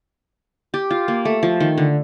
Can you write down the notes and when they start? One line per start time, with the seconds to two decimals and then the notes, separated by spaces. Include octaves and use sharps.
0.74 G4
0.91 F4
1.08 A#3
1.25 A3
1.43 F3
1.60 D#3
1.78 D3